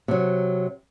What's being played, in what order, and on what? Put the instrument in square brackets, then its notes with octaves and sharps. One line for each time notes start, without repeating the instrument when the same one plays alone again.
[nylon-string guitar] C3 F#3